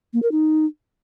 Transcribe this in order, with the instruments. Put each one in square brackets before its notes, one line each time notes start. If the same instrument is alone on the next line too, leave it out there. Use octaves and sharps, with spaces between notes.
[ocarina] A#3
A#4
D#4